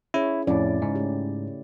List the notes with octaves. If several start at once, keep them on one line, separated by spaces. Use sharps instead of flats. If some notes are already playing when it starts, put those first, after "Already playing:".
C#4 E4 G#4 C#5
F2 A2 C#4 E4 D5
G#2 C#3
A3 G4